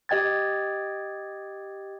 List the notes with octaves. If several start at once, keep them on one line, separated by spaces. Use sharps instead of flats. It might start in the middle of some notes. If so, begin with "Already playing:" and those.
G4 D#5 G5 G#6 A6